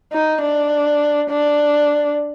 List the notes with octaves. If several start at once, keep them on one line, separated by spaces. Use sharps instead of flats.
D#4
D4
D4